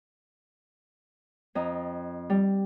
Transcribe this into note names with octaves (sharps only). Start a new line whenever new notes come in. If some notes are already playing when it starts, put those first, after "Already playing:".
F2 D#5 A#5
G3